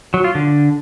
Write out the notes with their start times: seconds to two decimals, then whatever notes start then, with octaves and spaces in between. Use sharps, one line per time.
0.14 F#3
0.24 F4
0.35 D3